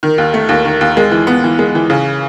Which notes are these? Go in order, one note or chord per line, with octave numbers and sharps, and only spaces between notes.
D#3
D#2
A3
D#2
D#3
D#2
G#3
E3
B3
E3
G#3
E3
C#3